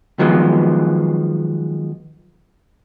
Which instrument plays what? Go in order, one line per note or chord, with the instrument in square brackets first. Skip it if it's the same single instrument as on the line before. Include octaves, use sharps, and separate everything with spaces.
[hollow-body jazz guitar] D#3 F3 F#3 G#3 B3